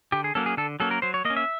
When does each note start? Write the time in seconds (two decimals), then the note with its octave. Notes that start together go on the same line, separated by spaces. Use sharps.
0.12 D3 G4
0.24 G#4
0.35 F#3 A#3 C#4 A4
0.46 G#4
0.57 D3 A4
0.80 F#3 A#3 C#4 A4
0.91 A#4
1.02 F#3 C5
1.14 C#5
1.25 A#3 D#5
1.30 C#4
1.37 E5